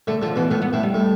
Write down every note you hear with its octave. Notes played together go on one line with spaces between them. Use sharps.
D3 A3
D3 F3
B2 E3
A2 B3
B3
A2 E4
G3
A2